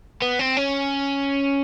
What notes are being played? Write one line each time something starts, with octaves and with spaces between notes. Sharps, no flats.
B3
C4
C#4